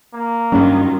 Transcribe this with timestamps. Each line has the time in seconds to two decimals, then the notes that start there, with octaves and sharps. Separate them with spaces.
0.14 A#3
0.52 G2 D#3 F#3 G3 C#4 F4